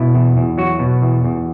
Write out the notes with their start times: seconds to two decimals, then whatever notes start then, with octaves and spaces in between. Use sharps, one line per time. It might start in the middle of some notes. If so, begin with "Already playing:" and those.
Already playing: B2 E4
0.15 E2
0.37 E2
0.58 F#3 F#4
0.79 B2
1.02 E2
1.24 E2